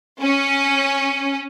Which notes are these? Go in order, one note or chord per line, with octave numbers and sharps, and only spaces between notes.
C#4